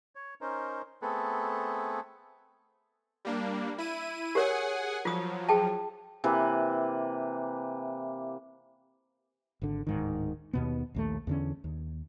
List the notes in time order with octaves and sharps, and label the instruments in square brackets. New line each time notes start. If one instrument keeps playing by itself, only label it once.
[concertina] C#5
C#4 D#4 A#4 C5
A3 B3 C4 G#4 A4 B4
[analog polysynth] G3 A#3 D4
E4 D#7
[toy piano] G4 A#4 C#5 [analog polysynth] G#4 F#5 G#5
[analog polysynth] F3 F#3 [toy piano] F4 D#6
[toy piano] G#4 G5 A5
[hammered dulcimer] C3 E3 A#3 B4
[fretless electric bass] G#1 D3
D1 G#2 D#3
D#2 B2 B3
A#1 D#2 A3
E2 D3 C#4
D#2